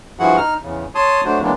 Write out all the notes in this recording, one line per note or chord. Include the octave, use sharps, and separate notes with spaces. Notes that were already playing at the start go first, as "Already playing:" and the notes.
G2 F3 E4 F#4 G#4 F#5
D#4 F6
E2 C#3
C#5 A5 C6 D#6
F#3 A3 D4 F#4 C5
C#3 E3 G#3 A#3 B3 D4